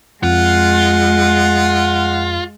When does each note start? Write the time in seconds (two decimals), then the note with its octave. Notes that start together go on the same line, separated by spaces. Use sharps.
0.23 F2 G#3 F4 F#5